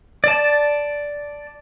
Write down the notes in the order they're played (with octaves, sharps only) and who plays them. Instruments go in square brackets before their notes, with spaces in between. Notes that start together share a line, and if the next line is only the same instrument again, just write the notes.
[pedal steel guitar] D5 A5